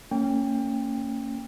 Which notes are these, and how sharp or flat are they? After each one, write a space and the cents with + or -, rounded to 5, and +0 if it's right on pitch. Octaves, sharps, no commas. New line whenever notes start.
A#3 -30 C#4 +0 G5 +20